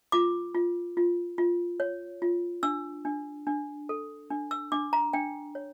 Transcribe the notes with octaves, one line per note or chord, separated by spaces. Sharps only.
F4 D6
F4
F4
F4
C#5
F4
D4 E6
D4
D4
A4
D4
E6
D4 D6
A#5
D4 G5
C#5